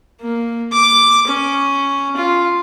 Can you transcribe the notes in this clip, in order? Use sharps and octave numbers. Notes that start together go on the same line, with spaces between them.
A#3
D6
C#4
F4